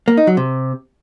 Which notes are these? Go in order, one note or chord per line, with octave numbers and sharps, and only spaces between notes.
A#3
D#4
F#3
C3